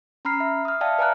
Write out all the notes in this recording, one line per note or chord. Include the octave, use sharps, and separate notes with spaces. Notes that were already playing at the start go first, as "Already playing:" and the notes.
C#4 A#5 B5 F6 C7
E5
D#6 F6
D5 E5 F5 G5 A5
B4 D5 G#5 A#5 F6 F#6